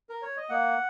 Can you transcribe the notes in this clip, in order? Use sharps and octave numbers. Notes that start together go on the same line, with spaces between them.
A#4
C#5
D#5
A#3 F#5